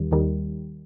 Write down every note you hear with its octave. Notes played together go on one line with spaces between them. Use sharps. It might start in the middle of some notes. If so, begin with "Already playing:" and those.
Already playing: D#2 D#3 G3
D#2 D#3 G3